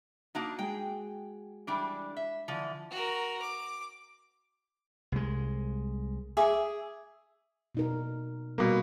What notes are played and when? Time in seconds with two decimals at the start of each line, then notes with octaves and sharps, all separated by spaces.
0.35 A#3 D4 D#4 F#4
0.59 G#3 G#4 G5
1.67 E3 G3 D4 D6
2.17 E5
2.48 D3 E3 F3
2.91 F#4 A#4
3.42 D6
5.12 C2 G#3
6.37 G#4 E5 D6
7.75 B2 D#4 A#4
8.58 B2 G3 A#3 B3